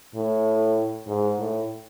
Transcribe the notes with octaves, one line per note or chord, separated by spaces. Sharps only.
A2
G#2
A2